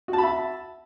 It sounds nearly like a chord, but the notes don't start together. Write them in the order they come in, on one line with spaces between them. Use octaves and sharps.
F#4 A5 B5 E5